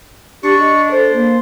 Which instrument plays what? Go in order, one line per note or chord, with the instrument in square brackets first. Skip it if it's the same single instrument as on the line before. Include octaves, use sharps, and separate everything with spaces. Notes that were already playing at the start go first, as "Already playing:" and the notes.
[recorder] D4 [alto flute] G4 [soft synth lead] C#6
[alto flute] D#5
[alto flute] A4 [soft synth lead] C5
[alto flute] A#3